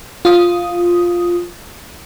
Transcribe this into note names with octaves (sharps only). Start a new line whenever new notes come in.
F4 D#6